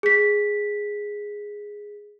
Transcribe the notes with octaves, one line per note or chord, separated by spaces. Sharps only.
G#4 B6